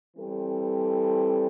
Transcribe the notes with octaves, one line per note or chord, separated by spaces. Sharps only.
E3 G3 C4 A4